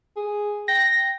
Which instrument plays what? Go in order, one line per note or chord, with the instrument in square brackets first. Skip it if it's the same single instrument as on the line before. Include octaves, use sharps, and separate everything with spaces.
[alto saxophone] G#4
[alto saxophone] G5 [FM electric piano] A#6